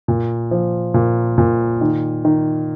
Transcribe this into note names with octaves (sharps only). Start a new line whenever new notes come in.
A#2
F3
A#2
A#2
D#3
D#3